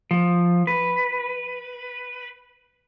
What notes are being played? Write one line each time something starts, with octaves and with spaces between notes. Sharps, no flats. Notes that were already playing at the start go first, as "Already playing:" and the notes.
F3
B4